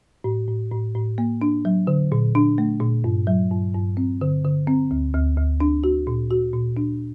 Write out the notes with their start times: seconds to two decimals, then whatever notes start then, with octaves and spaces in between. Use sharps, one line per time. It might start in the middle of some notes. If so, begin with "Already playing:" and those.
0.24 A2
0.48 A2
0.72 A2
0.95 A2
1.18 A#3
1.42 D4
1.65 F#3
1.87 D3
2.12 A#2
2.35 D4
2.58 A3
2.81 A#2
3.04 G2
3.27 F#3
3.51 G2
3.74 G2
3.97 C4
4.21 D3
4.45 D3
4.67 C4
4.91 D2
5.14 D2
5.38 D2
5.60 D4
5.84 F#4
6.07 A#2
6.31 F#4
6.54 A#2
6.77 D4